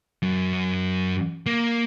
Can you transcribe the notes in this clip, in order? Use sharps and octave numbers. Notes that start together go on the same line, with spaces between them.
F#2
A#3